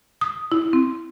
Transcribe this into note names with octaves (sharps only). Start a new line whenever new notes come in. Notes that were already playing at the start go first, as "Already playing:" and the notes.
D#6
E4
C4